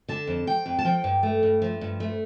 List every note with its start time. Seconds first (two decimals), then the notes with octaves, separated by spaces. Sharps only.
0.08 D3 A5
0.27 F2
0.47 F3 G5
0.66 F2
0.79 A5
0.85 F3 G5
1.04 G2
1.23 A3
1.43 G2
1.62 F3
1.81 G2
2.00 A3